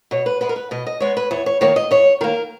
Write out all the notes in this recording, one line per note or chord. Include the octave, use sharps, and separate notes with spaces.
B2 C#5
B4
G#3 B3 B4
A#4
B4
B2 D#5
D#5
G#3 B3 C#5
B4
E2 C#5
C#5
D#3 A#3 C#5
D#5
E2 C#5
D#3 A#3 A#4